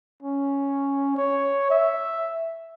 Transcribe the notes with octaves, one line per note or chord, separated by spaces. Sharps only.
C#4
C#5
E5